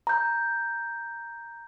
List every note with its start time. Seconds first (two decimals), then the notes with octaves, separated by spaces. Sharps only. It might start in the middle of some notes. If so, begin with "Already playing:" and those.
0.07 A#5 G6